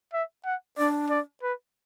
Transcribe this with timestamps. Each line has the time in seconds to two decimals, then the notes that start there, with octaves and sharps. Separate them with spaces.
0.13 E5
0.45 F#5
0.78 D4 D5
1.10 D5
1.43 B4